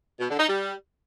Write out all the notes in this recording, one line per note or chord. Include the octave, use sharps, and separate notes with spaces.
B2
D3
D#4
G3